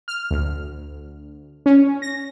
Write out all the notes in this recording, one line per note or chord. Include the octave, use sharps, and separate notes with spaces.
F6
D2
C#4
A#6